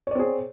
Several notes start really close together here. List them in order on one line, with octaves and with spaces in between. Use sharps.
C#5 D5 C4 G#4